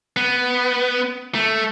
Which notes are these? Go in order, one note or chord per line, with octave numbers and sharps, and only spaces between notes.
B3
A3